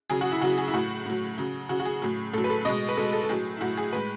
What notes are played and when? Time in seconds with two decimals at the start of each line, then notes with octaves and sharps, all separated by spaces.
0.10 C#3 F#3 G#4
0.21 F#4
0.31 E4
0.41 C#3 F#3 F#4
0.58 G#4
0.67 E4
0.73 A2 F#3 F#4
1.06 A2 F#3
1.38 C#3 F#3
1.69 C#3 F#3 F#4
1.80 F#4
1.85 G#4
2.02 A2 F#3
2.33 A2 F#3 A4
2.44 B4
2.50 A4
2.65 B2 G#3 D#5
2.89 B4
2.97 B2 G#3 A4
3.13 A4
3.24 A4
3.29 A2 F#3 G#4
3.57 E4
3.61 A2 F#3 F#4
3.77 G#4
3.93 A2 G#3 B4